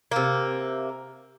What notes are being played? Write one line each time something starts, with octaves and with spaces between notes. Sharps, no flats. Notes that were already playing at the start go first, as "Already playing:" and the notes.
C3 A#3